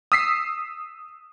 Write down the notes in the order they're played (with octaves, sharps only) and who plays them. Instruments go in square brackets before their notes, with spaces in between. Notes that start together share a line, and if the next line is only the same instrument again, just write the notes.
[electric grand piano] D#6 E6 B6 C7